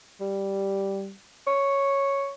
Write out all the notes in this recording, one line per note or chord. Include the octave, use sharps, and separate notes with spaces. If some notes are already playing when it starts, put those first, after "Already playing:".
G3
C#5